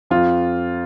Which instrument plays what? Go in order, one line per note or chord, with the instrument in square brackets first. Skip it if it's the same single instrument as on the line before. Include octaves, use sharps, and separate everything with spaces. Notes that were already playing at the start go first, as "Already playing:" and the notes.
[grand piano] F2 F4